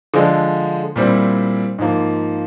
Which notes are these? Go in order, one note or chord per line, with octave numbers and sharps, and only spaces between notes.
D3 F3 G#3
A#2 G3 C4 E4
G#2 F3 A#3